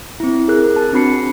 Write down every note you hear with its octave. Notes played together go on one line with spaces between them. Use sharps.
C4 E4
G#4 A#4 F#6
A5
C4 D4 F#4 B5 C7 C#7